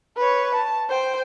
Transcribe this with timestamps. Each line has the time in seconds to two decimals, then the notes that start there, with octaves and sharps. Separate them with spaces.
0.17 B4 C#5
0.55 A5
0.89 C5 G5